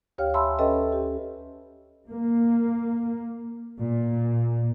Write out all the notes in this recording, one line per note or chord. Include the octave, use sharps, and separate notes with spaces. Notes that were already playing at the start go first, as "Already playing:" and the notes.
D2 G4 C#5 F5 G5 F6
E5 G#5 A5 B5 C6 E6
C#4 A4 B4 D#5 E5 G5
G4
A#3
A#2